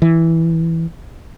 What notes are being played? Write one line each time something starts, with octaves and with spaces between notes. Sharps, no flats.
E3